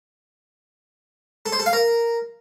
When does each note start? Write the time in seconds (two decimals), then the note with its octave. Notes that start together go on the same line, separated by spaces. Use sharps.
1.46 A4
1.52 C5
1.59 A4
1.66 F5
1.73 A#4